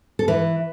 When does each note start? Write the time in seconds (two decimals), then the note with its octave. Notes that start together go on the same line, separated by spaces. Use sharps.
0.19 A4
0.28 E3 B4